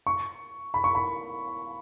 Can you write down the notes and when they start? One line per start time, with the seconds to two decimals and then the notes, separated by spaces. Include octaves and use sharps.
0.07 C#6
0.74 B5
0.84 C#6
0.95 B5